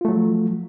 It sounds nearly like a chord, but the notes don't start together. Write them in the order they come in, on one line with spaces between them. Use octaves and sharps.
F4 A3 F#3 F3